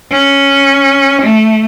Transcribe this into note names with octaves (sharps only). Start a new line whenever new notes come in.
C#4
A3